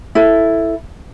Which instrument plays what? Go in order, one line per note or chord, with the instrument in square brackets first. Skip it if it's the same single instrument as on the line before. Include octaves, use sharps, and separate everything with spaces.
[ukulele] E4 A4